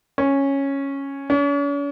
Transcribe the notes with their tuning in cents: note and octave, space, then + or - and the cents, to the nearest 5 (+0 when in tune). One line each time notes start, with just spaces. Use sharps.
C#4 -5
C#4 +45